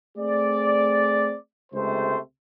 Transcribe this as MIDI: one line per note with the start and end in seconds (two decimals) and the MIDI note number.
0.17 1.34 57
0.17 1.34 60
0.17 1.34 68
0.17 1.34 74
1.73 2.17 37
1.73 2.17 48
1.73 2.17 56
1.73 2.17 57
1.73 2.17 72